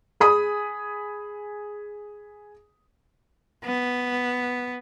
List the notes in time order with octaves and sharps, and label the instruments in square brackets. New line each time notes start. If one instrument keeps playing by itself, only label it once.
[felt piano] G#4 B5 D#6
[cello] B3